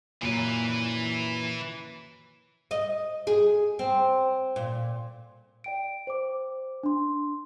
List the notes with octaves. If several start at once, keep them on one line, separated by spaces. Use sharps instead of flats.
F#2 A#2 E3 B4
D#5
G#4
C4
A#2
D5 G5 D7
C5 D6
D4 C6